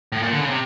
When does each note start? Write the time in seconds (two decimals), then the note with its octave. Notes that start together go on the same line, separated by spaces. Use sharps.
0.12 A2
0.22 A#2
0.32 D3
0.41 C#3
0.50 C3